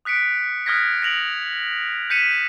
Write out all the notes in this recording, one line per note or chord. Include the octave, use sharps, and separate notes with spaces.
D#6 F#6 B6 C#7 D7
D#6 F6 F#6 G#6 A#6 B6
A#6 D7 F7 F#7
G6 B6 C#7 D#7 E7